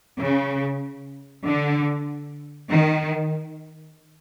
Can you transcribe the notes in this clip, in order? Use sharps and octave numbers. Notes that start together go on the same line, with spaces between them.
C#3
D3
D#3